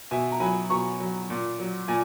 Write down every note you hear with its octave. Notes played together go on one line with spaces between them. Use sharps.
B2 E5 G#5
A#5
F#3 G#5 B5
B2 A#5 C#6
F#3
A#2
F#3
A#2 G#5